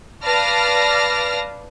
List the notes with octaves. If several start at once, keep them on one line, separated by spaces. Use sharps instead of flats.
B4 D5 F5 A5 F6 A#6